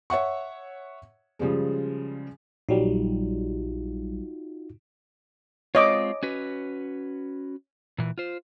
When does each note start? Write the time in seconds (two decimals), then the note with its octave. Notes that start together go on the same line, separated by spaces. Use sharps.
0.10 C#5 E5 F#5 C#6
1.39 C#3 F3 G3 G#3
2.69 A#1 F#3 G3 D#4 F4 F#4
5.75 G#3 C4 F4 C#5 D#5 D6
6.23 C#4 F#4 B4
7.98 A#2 E3
8.18 F4 C5